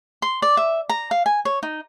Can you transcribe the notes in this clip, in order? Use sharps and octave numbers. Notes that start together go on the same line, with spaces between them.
C6
D5
E5
A#5
F5
G#5
C#5
D#4